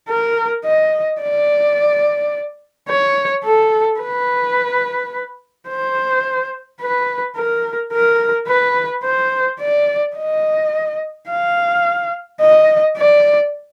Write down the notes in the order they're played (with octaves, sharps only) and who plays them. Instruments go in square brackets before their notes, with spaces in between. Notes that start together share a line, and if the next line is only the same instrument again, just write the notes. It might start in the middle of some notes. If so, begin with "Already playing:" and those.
[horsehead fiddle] A#4
D#5
D5
C#5
A4
B4
C5
B4
A#4
A#4
B4
C5
D5
D#5
F5
D#5
D5